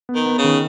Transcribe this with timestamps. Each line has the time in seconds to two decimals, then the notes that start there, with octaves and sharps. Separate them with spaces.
0.09 B3
0.15 D#3
0.26 B3
0.38 C#3
0.44 D#3